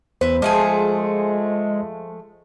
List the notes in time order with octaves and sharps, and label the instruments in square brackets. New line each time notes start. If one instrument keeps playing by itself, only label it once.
[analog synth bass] E2 [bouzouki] B4 E5 [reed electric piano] C5
[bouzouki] F3 A3 G#4 [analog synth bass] G#3